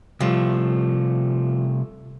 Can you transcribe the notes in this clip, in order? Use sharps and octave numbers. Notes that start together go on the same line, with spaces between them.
C3 F3 G3 A3